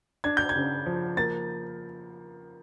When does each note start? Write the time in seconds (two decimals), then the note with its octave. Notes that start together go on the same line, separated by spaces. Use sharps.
0.24 D4 G#6
0.37 G6
0.49 G#6
0.55 C#3
0.86 F3
1.17 A#3 A6